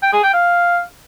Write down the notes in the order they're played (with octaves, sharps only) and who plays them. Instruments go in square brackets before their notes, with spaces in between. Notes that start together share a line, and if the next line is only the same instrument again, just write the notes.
[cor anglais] G5
G#4
G5
F5